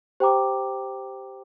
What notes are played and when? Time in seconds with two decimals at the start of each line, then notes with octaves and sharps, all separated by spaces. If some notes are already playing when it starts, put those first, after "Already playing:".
0.20 G4 C5 G5 A#5 D6